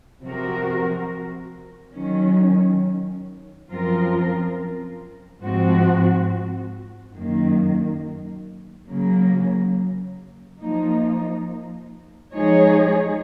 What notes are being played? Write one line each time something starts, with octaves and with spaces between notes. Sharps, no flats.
C3 F3 C4 F#4 A#4
D#3 F#3 C#4
F#2 F3 C4 F4 A#4
G#2 F3 C4 F#4
F#2 D#3 A#3
C#3 F#3 A#3
F3 A#3 D#4
F3 G#3 D#4 G#4 C#5